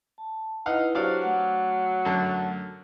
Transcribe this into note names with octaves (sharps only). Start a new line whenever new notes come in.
A5
D#4 E4 B4 F5 F#5
F#3 D4 G4 C5 D5 F5
A3 F#5
F#2 D3 A5